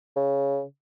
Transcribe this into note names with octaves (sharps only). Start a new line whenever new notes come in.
C#3